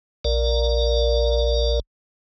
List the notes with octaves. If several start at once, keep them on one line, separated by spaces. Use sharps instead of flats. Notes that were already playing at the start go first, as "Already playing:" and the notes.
A#1 A#4 D5